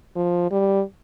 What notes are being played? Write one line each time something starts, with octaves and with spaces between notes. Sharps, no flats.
F3
G3